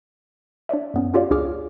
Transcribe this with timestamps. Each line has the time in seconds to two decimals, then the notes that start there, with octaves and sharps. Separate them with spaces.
0.69 D4 C#5 D5 E5
0.94 F#2 B3 C#4
1.14 C#4 F4 G4 C#5 D5 F5
1.31 C#2 D4 F4 G#4 D6 F6